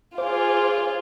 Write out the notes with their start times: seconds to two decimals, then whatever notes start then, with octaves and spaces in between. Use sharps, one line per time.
0.18 F4 G#4 C5 D6